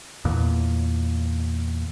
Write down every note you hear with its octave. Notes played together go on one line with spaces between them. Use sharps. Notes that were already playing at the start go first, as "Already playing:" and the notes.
E2 A#2